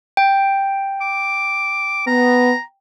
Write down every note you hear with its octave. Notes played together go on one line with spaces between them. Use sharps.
G5
D6
B3 A#5